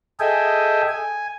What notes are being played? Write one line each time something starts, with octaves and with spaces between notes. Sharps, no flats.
G#4 A4 D#5 E5 G5 G#5
G#5